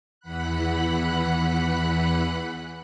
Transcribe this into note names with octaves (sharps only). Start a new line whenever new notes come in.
E2 E3 F#5 B5 F#6